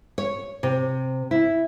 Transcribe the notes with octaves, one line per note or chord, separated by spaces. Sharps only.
C#5
C3
E4